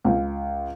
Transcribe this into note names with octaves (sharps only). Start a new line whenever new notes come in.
C#2